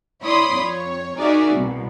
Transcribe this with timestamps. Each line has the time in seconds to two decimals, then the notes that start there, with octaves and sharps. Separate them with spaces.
0.23 E4 C#5 D5 B5 C6 D#6
0.56 F2 C#5
1.19 D#4 F#4 G#4 A#4 D5 E5
1.54 C2 B2